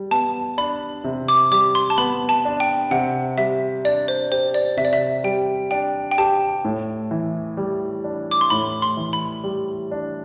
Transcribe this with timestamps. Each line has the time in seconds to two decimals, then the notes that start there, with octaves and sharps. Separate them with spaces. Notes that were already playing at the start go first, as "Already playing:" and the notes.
Already playing: G3
0.11 B3 A5
0.58 D4 B5
1.04 C3
1.28 D6
1.51 G3 D6
1.75 C6
1.90 A5
1.98 B3 B5
2.29 A5
2.45 D4
2.60 G5
2.91 C3 F#5
3.37 G3 E5
3.85 D4 D5
4.08 C5
4.31 G4 C5
4.54 D5
4.77 C3 E5
4.85 D5
4.93 E5
5.24 G3 G5
5.71 D4 G5
6.11 G5
6.18 G4 A5
6.65 A2
7.11 E3
7.57 G3
8.04 D4
8.31 D6
8.41 C6
8.50 A2 B5
8.82 C6
8.97 E3
9.13 B5
9.44 G3
9.91 D4